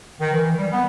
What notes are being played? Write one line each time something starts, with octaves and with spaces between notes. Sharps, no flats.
D#3
E3
G3
B3